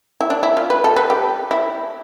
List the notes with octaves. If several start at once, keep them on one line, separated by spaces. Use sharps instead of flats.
E4
D4
E4
F4
B4
A4
B4
G4
E4